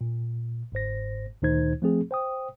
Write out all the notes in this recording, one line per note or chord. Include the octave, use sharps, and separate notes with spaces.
A#2
G1 G#2 C5 A#6
D2 A#2 D#3 D#4 C5 G#6
F3 A3 C4 G#4
C5 G5 D#6